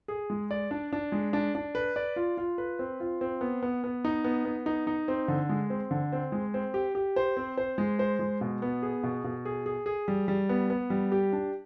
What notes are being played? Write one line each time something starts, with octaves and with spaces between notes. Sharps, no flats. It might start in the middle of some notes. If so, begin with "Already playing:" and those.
G#4
G#3
D5
D4
D4
G#3
D4
D4
B4
D5
F4
F4
B4
C4
F4
C4
B3
B3
B3
D#4
B3
B3
D#4
D#4
C4
D3
G#3
C4
D3
C4
G#3
C4
G4
G4
C5
C4
C5
G#3
C5
G#3
B2
B3
G#4
B2
B2
G#4
G#4
G#4
G3
G3
B3
B3
G3
G4
D4